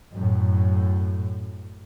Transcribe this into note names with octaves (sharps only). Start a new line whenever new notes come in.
F#2 A2